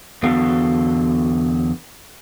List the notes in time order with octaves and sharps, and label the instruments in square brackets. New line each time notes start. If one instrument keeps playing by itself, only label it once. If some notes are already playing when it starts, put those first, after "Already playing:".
[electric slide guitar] E2 D3 F#3 B3 A4 F5